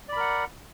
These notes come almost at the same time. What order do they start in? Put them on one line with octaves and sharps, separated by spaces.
D5 B5 A#4 F#5